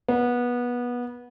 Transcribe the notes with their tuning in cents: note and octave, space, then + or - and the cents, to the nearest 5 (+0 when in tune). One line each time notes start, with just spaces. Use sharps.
B3 -20